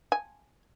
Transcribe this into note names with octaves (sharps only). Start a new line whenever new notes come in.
G#5